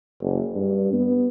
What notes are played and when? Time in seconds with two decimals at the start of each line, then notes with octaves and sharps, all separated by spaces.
0.22 F#1
0.55 G2
0.93 B3